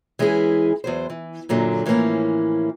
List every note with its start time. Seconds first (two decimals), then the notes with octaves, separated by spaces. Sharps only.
0.19 E3 G#3 C#4 E4 G#4
0.84 E2 F#3 C5
1.10 E3
1.49 F#2 A#2 D3 F#3
1.86 A2 E3 F3 G3 A#3 C#4